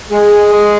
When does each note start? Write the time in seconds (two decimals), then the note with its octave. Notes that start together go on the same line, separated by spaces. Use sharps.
0.10 G#3 G#4
0.53 G#3